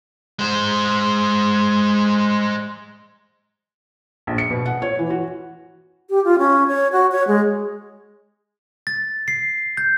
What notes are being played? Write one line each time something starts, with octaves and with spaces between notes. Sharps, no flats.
G#3 C5
A#1
C#7
B2
F#5
C#5
E3
F#4
G4
F4
C#4
C#5
F#4
C#5
G#3
A6
C7
G6